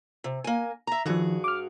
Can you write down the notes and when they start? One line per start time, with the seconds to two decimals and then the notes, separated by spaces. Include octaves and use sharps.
0.24 C3
0.44 A#3 G#5
0.87 E5 A#5
1.06 G2 D#3 F3 F#4 G#4
1.44 D6 F6